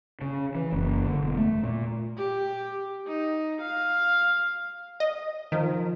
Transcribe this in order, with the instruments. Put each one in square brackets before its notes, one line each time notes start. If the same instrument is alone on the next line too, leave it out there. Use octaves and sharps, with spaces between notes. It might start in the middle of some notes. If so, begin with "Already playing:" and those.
[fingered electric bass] C#3
E3
F#1
D3
E1
A3
A#2
[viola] G4
D#4
F5
[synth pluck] D#5
[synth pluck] D#3 [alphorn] F3